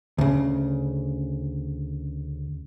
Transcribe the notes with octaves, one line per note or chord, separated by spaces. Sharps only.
D2 C#3